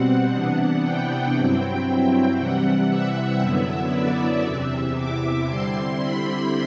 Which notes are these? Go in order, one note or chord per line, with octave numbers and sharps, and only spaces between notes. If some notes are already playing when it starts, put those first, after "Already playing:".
Already playing: B2 G3 C4 F#5
C3 E3 B3 D4
G5
G2 F#3 C4 E4
C3 E3 G3 F#5
E5
F#2 D3 F#3 B3 E4 E5
D5
E2 C3 E3 E5
D6
D3 G3 C4 E4 C6
B5